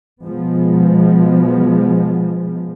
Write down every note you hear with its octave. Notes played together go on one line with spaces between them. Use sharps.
B2 F3 G#3 B3